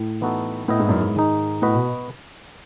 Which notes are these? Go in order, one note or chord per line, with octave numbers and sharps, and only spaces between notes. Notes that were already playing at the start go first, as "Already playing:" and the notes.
Already playing: A2
E3 B3 D#4 F#4 A4
A2 B3 E4 B4 D#5
G#2
F#2
G#2
D#3 G#3 D#4
A2 B3 F#4 B4 D#5
B2